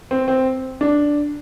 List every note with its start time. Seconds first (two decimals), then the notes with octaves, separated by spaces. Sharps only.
0.11 C4
0.28 C4
0.81 D4